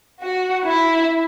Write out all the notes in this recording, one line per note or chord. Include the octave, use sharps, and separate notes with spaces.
F#4
E4